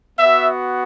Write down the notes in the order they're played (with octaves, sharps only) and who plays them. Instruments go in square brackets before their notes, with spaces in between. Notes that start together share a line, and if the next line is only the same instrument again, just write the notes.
[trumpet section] B3 F#4 E5